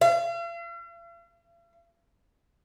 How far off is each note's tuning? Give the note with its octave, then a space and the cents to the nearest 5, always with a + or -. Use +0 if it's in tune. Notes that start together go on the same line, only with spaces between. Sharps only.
F5 -45